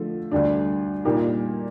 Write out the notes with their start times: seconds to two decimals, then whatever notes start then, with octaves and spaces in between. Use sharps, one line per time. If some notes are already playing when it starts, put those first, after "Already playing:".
Already playing: D3 F3 A3
0.32 D2 D3 G3 D4
1.05 A#2 G3 A#3 D#4 G4